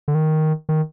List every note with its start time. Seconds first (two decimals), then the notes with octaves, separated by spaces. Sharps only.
0.08 D3
0.15 D#3
0.69 D#3